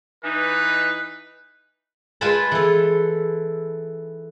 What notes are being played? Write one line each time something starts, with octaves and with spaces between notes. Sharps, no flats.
E3 D#4 B4
G#3 F4 B4 G#5 A5 B5
E3 A4